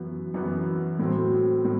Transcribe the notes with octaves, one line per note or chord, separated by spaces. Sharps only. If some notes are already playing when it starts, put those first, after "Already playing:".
Already playing: F#2 E3 B3 F#4
F#2 E3 B3 F#4
A2 F#3 C4
A2